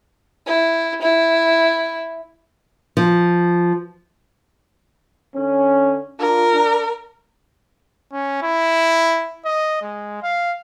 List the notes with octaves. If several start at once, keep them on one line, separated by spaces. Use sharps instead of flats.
E4
E4
F3
D3 C#4
D4 F4 A#4
D4
C#4
E4
D#5
G#3
F5